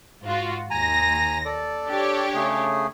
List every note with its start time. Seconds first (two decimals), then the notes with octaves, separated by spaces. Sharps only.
0.24 G#2 F4 F#4
0.71 D#2 G#5 A#5 A#6
1.45 A4 D5
1.87 D4 G4 C#5
2.34 C#3 A3 G#4